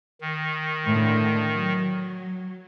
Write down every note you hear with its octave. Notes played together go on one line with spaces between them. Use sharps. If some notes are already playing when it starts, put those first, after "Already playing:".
D#3
A2 D3
F#3